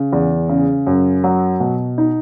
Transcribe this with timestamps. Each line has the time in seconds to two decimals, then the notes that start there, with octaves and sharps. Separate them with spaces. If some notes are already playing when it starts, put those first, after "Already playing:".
Already playing: C#3
0.13 E2
0.49 C#3
0.87 F#2
1.24 F#3
1.60 B2
1.98 D#4